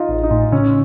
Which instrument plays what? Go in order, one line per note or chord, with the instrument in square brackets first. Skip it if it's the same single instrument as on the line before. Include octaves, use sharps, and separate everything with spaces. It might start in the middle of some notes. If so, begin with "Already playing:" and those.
Already playing: [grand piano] D#4 F4
[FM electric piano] A1
[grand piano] D#4
[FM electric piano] A2
[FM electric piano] C#3 [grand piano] C#4